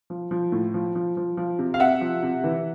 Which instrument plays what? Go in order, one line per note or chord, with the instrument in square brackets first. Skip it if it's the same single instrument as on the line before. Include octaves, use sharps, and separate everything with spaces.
[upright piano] F3
F3
A2
F3
F3
F3
F3
C3
F5
C3 E5 F#5
F3
C3
E3